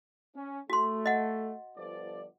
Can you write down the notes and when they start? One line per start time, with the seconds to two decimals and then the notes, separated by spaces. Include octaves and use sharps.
0.35 C#4
0.70 A3 F#4 C6
1.06 D#5 F#5
1.76 G1 F3 D5